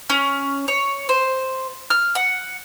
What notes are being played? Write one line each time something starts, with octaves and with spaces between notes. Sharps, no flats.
C#4
C#5
C5
F6
F#5